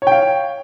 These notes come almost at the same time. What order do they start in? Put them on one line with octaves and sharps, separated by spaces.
C#5 G5 F5